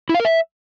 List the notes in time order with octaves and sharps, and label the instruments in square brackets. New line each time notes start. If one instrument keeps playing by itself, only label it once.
[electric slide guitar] E4
F5
A#4
E5